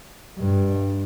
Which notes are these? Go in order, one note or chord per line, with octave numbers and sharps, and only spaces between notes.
G2